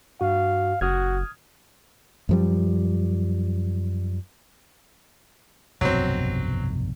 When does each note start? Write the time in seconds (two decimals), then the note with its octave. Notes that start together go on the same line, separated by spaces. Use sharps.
0.21 G2 F#4 F5
0.81 F#1 F#4 D#6 F6 G#6
2.29 F#2 F3 G3
5.81 F1 B1 G2 F#3 C4